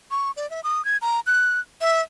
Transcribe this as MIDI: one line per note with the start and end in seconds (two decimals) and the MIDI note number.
0.11 0.31 85
0.37 0.49 74
0.50 0.61 76
0.64 0.84 87
0.85 0.97 92
1.02 1.20 82
1.27 1.60 90
1.81 2.02 76